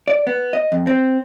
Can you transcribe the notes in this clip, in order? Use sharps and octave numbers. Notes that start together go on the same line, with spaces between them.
D5
B3
D#5
F2
C4